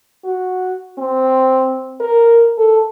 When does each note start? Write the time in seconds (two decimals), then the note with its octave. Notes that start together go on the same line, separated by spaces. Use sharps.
0.24 F#4
0.98 C4
2.00 A#4
2.58 A4